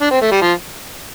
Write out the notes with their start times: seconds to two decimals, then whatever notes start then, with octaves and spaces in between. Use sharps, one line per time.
0.01 D4
0.11 C4
0.21 A3
0.31 G3
0.41 F3